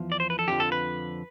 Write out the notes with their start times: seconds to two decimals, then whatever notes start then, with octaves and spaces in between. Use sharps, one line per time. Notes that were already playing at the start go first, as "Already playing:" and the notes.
Already playing: E2 F3
0.12 D5
0.20 C5
0.30 B4
0.39 A4
0.48 F2 D3 F3 G4
0.60 A4
0.72 B4